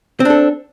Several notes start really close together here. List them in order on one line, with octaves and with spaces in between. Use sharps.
C4 D4 A4